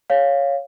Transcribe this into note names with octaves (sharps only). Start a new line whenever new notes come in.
C#5 F5